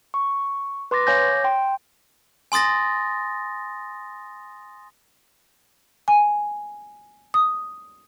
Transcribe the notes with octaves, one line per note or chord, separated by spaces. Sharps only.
C#6
B4 C6 D6 A6 A#6
C#5 F5 G#5 D6 G6 A#6
G5 C6
G#5 C6 D#6 A6 A#6
G#5
D#6